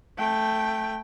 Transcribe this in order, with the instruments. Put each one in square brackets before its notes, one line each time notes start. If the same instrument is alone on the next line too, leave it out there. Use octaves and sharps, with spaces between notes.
[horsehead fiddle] A3 G5